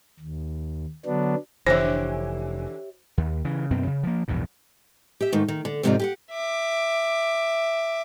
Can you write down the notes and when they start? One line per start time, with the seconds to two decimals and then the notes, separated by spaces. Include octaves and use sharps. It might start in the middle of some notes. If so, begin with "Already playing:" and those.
0.19 D#2
1.05 D3 F#3 B3 D4
1.67 F1 D3 E3 G4 C5 C#5 E5
3.18 D#2
3.45 C#3 E3
3.71 F#2 B2 C4
3.87 C#3
4.03 F3 A#3
4.28 A#1 E2 G#2 B2
5.21 G4 E5
5.32 G#2 D#3 A3
5.48 D#3
5.65 D3
5.83 F2 G#2 C3 C4 F4 D5
6.00 G4 B4 F#5
6.32 E5 D6